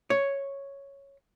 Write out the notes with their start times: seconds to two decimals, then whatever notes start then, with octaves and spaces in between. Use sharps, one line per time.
0.10 C#5